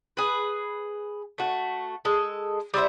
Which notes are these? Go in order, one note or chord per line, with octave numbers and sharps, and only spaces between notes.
G#4 B4
A3 F#4
G#3 A4
G3 E4 C5 E5